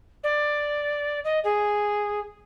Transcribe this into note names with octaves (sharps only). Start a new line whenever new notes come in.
D5
D#5
G#4